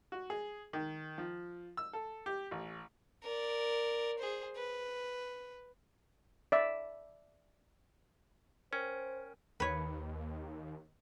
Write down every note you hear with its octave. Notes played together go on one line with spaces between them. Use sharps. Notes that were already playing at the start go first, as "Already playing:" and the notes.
F#4
G#4
D#3
F3
E6
A4
G4
A1
A#4 D5
G#4 C5
B4
D5 E5
C#4 A#4 C5 G5 G#5
D#2 B4 C#5